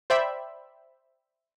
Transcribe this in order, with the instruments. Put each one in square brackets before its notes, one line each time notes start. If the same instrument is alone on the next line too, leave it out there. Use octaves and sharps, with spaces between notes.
[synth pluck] C5 D5 E5 G5 B5